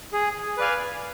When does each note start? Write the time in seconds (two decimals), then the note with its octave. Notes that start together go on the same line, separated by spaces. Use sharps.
0.13 G#4
0.58 B4 D5 F5 G#5